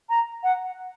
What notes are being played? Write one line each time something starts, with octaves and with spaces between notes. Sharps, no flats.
A#5
F#5